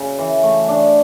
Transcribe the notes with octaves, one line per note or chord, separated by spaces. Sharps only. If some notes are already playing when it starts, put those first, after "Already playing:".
Already playing: C#3
E3
A3
D4